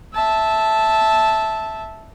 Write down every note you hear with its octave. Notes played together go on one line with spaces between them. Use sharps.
E5 A5